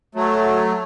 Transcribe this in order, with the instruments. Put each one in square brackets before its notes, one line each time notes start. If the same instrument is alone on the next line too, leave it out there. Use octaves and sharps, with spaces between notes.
[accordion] F#3 A3